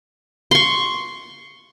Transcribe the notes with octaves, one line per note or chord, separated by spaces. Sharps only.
C6 C#6